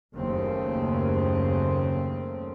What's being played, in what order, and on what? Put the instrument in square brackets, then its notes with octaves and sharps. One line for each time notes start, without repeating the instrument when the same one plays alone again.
[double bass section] F#1 D#2 C#3 A3 A#3 C4